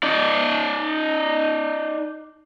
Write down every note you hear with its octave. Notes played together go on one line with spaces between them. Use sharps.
D#4 D5